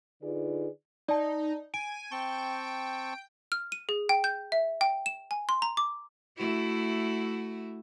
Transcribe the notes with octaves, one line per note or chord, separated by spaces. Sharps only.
D3 D#4 F4 G#4 B4 D5
D#4 D5 A5
G#5 D7
C4 G5 A5 C#6
F6
D#7
G#4
G5
G6
E5
G5
E7
G#5
C6
A#5
D6
A3 E4 F#4